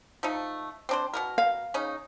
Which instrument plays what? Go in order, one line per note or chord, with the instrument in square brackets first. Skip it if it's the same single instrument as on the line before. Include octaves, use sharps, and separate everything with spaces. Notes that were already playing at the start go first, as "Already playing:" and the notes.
[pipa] F3 A3 D#4
C4 D4 C5
B2 G#3 A#4
[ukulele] F5
[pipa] C#3 C#4 D#4